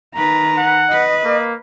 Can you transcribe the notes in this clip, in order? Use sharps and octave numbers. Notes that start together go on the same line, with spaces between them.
D#3 B4 A#5
F#5
B4 D#5
A#3